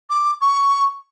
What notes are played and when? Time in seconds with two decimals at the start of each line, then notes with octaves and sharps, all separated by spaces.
0.10 D6
0.41 C#6